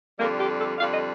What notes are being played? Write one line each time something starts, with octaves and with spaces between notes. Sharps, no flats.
F2 D3 G3 A#3
G4
A4
F2 D3 G3 F5
D#5